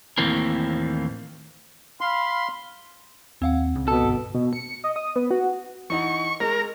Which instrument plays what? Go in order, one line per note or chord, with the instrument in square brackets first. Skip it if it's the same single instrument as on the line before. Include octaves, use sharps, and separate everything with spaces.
[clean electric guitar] D#2 A2 E3 A#3 C4 A#4
[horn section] F5 B5 [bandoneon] C6
[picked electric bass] D#2 [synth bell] C4 F5 F#5
[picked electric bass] C#2 C#3
[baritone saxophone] B2 [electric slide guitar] A4
[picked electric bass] G1
[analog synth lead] B2
C#7
D#5
D#6
B3
F#4
[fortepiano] E3 D#4 F#5 [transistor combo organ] C#6
[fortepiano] G#3 [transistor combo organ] A#4